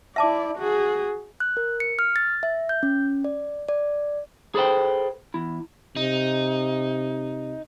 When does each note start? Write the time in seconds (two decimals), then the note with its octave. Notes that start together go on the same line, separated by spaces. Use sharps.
0.16 E4 D5 E5 A5 D6
0.58 F#4 G#4
1.40 F#6
1.57 A#4
1.80 C#7
1.99 F6
2.16 A6
2.43 E5
2.69 G6
2.83 C#4
3.24 D5
3.69 D5
4.55 G#4 A4 B4 C5 G5
5.34 E2 E4
5.96 C3 D#4